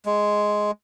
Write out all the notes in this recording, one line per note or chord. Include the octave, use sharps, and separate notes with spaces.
G#3